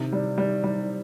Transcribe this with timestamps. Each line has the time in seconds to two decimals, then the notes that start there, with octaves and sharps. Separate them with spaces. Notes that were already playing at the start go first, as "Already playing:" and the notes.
Already playing: C3 D#3
0.13 G3
0.38 G3
0.64 G3